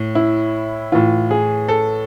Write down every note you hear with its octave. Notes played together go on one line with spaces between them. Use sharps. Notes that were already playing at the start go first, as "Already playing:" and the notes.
Already playing: A2
E4
A2 E3 F4
G#4
A4